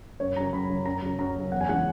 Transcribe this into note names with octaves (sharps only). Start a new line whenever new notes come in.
F#2 C#5
C#3 F#3 A#5
F#2 B5
C#3 F#3
F#2 A#5
C#3 F#3
F#2 A#5
C#3 F#3
E2 F#5
G#5
C#3 E3 G#3 F#5